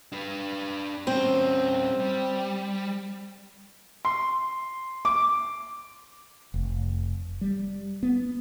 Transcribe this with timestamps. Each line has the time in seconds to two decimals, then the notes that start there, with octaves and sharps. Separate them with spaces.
0.12 D4 B4
1.07 G3 C4 C#4
2.00 G3
4.05 C6
5.05 D6
6.54 F1
7.41 G3
8.03 B3